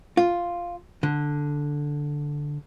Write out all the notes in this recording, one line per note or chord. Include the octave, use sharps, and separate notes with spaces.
F4
D3